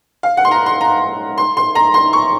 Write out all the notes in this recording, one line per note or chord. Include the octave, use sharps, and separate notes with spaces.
F5
F#5
C6
A#5
C6
A#5
C6
C6
A#5
C6
C#6